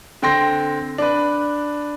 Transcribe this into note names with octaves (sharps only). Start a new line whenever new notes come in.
D3 C4 G5 C6 A#6
D4 B4